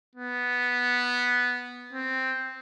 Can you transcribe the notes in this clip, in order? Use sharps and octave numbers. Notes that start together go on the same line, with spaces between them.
B3
C4